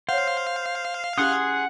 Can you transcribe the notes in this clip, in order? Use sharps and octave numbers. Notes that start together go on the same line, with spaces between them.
C5 C#5 F5 F#5
C#4 E4 G4 G#4 F#5 C6 D#6